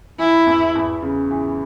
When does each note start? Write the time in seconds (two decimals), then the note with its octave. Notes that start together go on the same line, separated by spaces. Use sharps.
0.19 E3 E4
0.47 E2
0.75 E2
1.03 C#3
1.31 E3